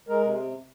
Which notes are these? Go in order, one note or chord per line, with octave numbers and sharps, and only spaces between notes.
G#3 A#4
C3